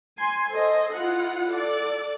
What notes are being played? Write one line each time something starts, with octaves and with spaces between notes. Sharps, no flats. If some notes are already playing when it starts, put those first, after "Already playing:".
G#5 C6
A4 C5 D#5
E4 F4 F#5
A4 D5